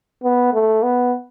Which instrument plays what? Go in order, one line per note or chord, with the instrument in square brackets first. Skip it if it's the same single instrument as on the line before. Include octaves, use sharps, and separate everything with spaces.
[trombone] B3
A3
B3